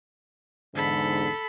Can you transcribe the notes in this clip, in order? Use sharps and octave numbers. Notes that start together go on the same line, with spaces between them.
E2 G#2 D3 A4 B5